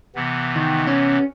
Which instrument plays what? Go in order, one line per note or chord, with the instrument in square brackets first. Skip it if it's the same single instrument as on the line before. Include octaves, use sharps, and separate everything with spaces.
[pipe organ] C3 E3 B3
[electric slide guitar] D#3
C#4